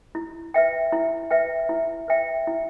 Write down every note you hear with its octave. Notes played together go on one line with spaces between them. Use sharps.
E4
B4 E5 G5
E4
B4 E5 G5
E4
B4 E5 G5
E4